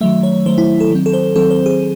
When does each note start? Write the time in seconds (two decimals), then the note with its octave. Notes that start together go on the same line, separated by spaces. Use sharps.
0.01 D#3 F#3 A3 E5
0.23 C#5
0.46 D#3 F#3 A3 C5
0.58 E4
0.80 A4
0.91 D#3 F#3 C4
1.06 A4
1.13 C5
1.36 D#3 F#3 C4 A4
1.51 C5
1.66 G#4